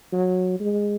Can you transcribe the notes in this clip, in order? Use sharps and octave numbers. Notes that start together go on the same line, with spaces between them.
F#3
G#3